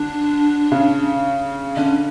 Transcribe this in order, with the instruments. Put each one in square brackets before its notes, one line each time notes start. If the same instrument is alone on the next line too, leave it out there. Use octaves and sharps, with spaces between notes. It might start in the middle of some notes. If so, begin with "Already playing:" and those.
Already playing: [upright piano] D3 [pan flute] D4
[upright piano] C#3
[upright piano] D3 [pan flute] C#4